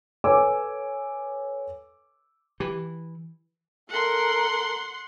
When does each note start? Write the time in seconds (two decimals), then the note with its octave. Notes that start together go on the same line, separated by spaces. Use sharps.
0.24 A4 B4 C#5 G#5 D6 E6
2.60 E3 G4
3.89 A4 A#4 F#5 C6